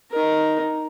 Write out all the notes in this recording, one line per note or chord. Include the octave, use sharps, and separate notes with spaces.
D#4 A#4